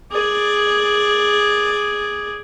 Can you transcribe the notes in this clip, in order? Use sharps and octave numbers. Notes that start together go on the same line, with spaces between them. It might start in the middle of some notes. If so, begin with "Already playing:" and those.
G#4 D5